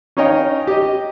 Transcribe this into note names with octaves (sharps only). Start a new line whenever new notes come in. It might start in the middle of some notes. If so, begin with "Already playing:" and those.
C#4 D#4 C#5 D#5 F5 G5
G4 D#5